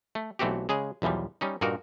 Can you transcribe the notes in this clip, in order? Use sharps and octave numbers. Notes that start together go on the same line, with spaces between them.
A3
B1 E3 A3 C4 F#4 G4
C#3 G#3 G#4
B1 E2 E3 F3 G3
G3 C#4 D#4
G2 A#2 A#3 D#4 F#4 A#4